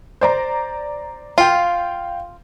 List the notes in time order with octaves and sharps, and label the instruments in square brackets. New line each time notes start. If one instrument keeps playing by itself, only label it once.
[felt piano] C5 D5 A#5
[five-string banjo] F4 [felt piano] F5 G5